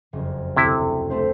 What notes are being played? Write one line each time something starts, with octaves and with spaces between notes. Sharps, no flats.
F#1 F2
D2 C3 E4
A3 C4 C5